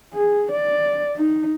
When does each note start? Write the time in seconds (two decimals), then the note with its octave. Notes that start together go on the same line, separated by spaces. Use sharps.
0.14 G#4
0.51 D5
1.17 D#4